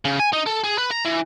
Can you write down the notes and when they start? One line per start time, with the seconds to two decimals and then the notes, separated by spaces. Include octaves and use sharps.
0.05 C#3
0.20 G#5
0.33 D#4
0.47 A4
0.64 G#4
0.78 B4
0.91 A#5
1.05 E3